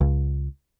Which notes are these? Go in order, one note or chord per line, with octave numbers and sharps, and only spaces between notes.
C#2